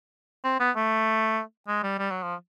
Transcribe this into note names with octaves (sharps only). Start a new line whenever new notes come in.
C4
B3
A3
G#3
G3
G3
F#3
F3